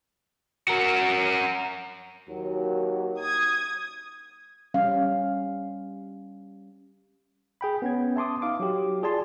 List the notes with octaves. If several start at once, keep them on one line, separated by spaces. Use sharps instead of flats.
F#4 A#4
D#2 F#3
D#6 G#6
G3 C#4 F5
G#4 G5 B5
B3 C#4 G#6
E5 A5 C6 D6 D#6
D#4 F5 D6
F#3 G4
F4 G#4 D5 G#5 A5 C6